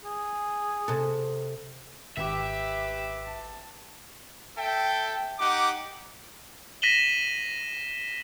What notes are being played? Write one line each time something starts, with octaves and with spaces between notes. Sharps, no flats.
G#4
C3 A4
G#1 G4 B4 E5 D6
A5
A4 E5 G5
D#4 G4 F#5 D6
A#6 B6 D#7 E7 F#7 G7